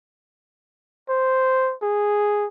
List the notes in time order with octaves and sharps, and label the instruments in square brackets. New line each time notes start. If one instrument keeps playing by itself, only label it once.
[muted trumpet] C5
G#4